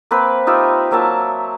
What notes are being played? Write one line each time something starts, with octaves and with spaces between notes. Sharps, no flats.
A#3 C4 B4
D#4 F4 G4 E5
F#3 A#3 E5 A5